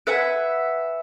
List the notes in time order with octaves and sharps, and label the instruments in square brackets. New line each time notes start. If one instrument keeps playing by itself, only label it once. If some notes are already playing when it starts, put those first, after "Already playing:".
[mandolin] B4 E5 F#5 G#5